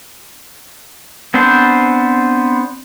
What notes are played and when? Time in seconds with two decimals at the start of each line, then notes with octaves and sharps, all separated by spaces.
1.34 B3 C4 D4 C5